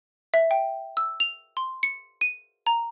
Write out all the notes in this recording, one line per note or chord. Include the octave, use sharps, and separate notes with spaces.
E5
G5
E6
F7
C6
C#7
D#7
A#5